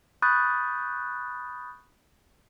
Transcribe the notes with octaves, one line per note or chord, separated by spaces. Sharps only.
B5 C#6 D#6 F#6 G6 A6